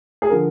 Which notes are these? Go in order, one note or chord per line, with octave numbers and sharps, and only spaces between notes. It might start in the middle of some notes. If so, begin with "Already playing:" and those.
G#4
D3 F3 A#4